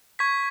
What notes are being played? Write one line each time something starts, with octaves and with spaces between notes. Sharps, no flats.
C#6 G#6 B6